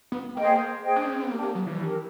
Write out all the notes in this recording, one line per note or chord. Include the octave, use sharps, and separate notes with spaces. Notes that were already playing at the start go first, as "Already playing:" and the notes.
B3
A#3 G#4 C5 D#5 G5
G#4 C5 D#5 G5
D4
C#4
C4
B3
A#3 D4 G4 A#4
A#3
F#3
E3
D4 G4 A#4